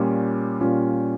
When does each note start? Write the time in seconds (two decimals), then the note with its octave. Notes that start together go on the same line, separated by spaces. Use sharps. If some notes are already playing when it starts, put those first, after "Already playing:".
Already playing: A#2 G3 C#4 F4
0.61 A#2 G3 C#4 F4